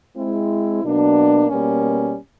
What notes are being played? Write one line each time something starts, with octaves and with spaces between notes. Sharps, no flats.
G#3 C4 E4
B2 F#3 A#3 D4
B2 G3 A#3 C#4